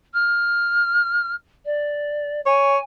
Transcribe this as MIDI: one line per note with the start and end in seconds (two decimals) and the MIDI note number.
0.14 1.34 89
1.65 2.41 74
2.46 2.78 73
2.46 2.81 80